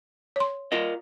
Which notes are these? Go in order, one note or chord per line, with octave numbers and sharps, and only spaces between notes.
C#5 C6
F4 A#4 D#5